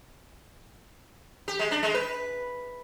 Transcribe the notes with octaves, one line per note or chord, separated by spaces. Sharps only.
G4
G#3
D4
G#3
B4